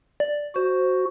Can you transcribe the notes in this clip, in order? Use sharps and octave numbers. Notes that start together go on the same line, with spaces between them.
D5
F#4 C5